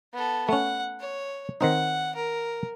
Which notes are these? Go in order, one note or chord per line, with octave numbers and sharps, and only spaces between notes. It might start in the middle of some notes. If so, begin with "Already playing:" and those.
B3 A4
A3 C#4 F#5
C#5
D#3 C4 D#4 F#5
A#4